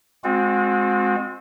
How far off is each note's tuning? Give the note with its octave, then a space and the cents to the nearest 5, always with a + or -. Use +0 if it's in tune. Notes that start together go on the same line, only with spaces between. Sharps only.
G#3 +0 C4 +0 F#4 -40